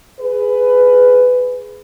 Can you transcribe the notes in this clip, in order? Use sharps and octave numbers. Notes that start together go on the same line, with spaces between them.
G#4 B4